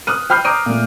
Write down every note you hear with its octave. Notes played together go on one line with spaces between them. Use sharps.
D#6 F6 F#6 D#7
G5 B5 F6 G6 C7
A#5 D6 D#6 G6 D7 D#7
A#2 A3